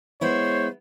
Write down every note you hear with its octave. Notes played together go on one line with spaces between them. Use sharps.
G#3 B3 E4 C5 C#5